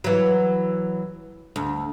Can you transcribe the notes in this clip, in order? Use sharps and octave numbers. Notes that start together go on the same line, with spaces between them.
E3 F#3
D2